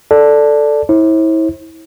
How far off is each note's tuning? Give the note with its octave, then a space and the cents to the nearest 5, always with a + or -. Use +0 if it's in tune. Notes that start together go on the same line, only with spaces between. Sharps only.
A4 +0 D5 +0
E4 -30 C5 +45